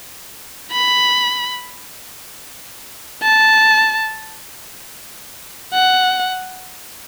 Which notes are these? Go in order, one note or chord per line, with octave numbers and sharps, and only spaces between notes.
B5
A5
F#5